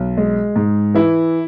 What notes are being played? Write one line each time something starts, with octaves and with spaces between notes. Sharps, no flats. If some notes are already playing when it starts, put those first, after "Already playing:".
Already playing: B1
G#3
G#2
E3 E4